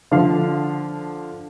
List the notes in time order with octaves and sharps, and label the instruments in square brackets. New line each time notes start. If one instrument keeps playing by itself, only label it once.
[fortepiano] D3 F3 F5